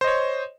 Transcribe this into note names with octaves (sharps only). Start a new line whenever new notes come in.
C5 C#5 D#5